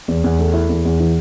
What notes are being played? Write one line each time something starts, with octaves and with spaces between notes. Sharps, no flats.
E2
E2
A3
E4
E2
E2
E3